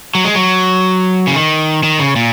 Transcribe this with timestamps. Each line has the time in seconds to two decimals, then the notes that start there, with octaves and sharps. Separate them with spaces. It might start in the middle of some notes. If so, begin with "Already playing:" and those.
0.15 F#3
0.25 G#3
0.35 F#3
1.27 C#3
1.35 D#3
1.84 D#3
1.99 C#3
2.16 A#2